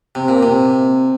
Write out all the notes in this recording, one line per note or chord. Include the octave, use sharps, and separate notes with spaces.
C3
A#2
C3